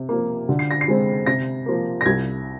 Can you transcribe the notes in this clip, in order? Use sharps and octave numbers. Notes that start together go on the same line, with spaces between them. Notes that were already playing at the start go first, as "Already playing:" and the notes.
Already playing: C3
F3 A#3
D3
C7
A#6
C7
G#3 C4
C3 A#6
F3 A#3
A#6
C2 G#6